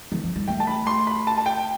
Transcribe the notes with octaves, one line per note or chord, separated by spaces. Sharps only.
E3
F3
G3
A3 G5
A5
B5
C6
B5
A5
A5
G5